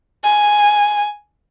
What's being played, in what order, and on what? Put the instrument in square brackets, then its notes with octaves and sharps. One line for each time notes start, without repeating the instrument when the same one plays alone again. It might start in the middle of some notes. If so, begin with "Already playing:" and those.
[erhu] G#5